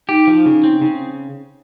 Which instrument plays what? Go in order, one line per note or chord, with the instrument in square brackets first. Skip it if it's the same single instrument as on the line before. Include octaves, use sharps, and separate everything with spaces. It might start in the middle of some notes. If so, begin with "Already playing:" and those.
[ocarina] D#4 [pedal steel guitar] G4
[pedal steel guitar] F3
C#3
C4
C#3